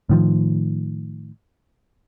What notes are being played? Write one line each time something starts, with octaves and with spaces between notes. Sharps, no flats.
A2 D#3 F3